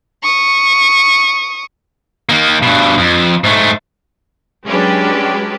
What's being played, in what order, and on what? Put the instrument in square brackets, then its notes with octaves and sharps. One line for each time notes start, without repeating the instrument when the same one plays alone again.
[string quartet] C#6 D#6
[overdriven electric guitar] D#3 A#3
G2 B2
F2
G#2 A3
[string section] F#3 G#3 C#4 D4 G4 B4